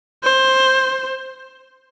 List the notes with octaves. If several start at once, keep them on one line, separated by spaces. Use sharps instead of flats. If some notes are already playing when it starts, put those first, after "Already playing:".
C5